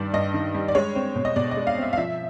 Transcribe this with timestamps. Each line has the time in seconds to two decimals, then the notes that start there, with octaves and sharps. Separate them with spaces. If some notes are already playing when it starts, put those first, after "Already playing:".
Already playing: G2 D#3 G3 D5
0.13 G2 D#5
0.34 D#3
0.55 G3
0.68 D5
0.75 G#3 C#5
0.95 C4
1.16 B2
1.25 D#5
1.36 B2 D5
1.51 D#5
1.57 G#3
1.67 F5
1.77 C4 E5
1.93 F5
1.97 F3 E5